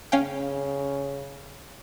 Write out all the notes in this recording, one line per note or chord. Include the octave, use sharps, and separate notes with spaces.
C#3 C#4 F5 G5